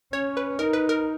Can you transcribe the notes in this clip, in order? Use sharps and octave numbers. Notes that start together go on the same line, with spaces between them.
C#4 C#5
B4
D#4 A#4
B4
A#4